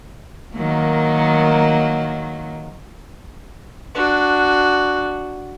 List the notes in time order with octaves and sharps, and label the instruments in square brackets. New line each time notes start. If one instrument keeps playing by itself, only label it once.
[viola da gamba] D#3 F#3 A#3
[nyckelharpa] D4 F#4